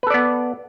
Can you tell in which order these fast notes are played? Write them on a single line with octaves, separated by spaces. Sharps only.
B4 A4 D5 B3